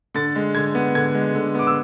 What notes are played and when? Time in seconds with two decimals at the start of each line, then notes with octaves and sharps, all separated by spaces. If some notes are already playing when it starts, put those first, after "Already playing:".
0.14 D3 A6
0.36 G#3
0.55 D3 G#6
0.75 B3
0.95 D3 G#6
1.15 G#3
1.35 D3
1.54 B3 D6
1.67 E6